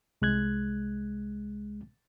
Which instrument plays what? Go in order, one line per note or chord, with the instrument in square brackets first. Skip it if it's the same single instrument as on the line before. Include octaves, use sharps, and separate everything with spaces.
[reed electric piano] C2 G#3 F#6 G#6